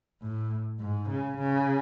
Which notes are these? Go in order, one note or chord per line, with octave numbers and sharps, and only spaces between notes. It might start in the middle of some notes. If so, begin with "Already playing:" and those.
A2
G#2
C#3
C#3